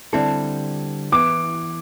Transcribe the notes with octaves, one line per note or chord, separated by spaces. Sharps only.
D3 G3 C4 E4 A4 A5
E3 B3 E4 D6